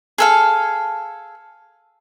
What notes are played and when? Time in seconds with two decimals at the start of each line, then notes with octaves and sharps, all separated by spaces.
0.18 G#4 A4 F5